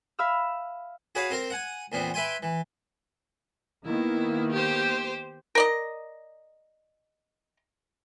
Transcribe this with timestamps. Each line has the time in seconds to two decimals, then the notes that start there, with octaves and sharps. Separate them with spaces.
0.19 E5 F5 B5 E6 F6
1.15 F#4 G#4 B4 C#5 F5
1.30 C4 A#4 C5
1.50 F#5 G#5
1.92 E2 A#2 B3 C4
2.14 B4 E5 G5 G#5 C6
2.43 E3
3.86 D#3 A#3 B3 E4
4.52 G4 C5
5.55 A#4 D5 D#5